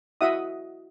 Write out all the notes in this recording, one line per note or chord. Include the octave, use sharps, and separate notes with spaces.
E4 F#4 D#5 E5 F#5 D#6